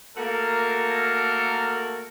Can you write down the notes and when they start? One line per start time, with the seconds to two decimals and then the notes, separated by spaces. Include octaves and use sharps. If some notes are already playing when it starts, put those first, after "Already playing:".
0.17 A3 A#3 F#4 A4 A#4